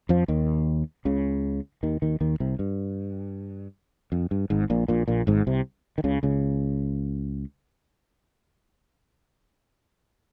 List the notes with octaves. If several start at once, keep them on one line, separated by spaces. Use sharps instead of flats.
F2 F3
D#2 D#3
C#2 C#3
D#2 D#3
D#2 D#3
D#2 D#3
C2 C3
G2
F2
G2
G#1 G#2
A#1 A#2
A#1 A#2
A#1 A#2
G#1 G#2
C2 C3
D#3
C#2 C#3
C#2 C#3